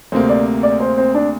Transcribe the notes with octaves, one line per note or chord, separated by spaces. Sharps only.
D2 C3 A#3 C5
D5
D5
C5
C4
D4